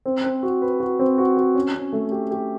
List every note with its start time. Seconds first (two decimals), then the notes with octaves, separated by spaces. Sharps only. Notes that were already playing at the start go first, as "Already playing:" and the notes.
0.06 C4
0.24 C4
0.43 F#4
0.62 B4
0.80 F#4
0.99 C4
1.18 F#4
1.37 F#4
1.55 C#4
1.75 C#4
1.93 A3
2.11 G4
2.31 G4